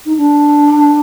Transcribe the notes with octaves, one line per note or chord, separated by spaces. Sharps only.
D#4
D4